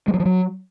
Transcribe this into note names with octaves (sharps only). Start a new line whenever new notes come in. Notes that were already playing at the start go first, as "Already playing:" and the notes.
G#3
F#3
F3
F#3